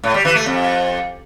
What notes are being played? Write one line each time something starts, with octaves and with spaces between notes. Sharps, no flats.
A2
G3
E3
A3
F2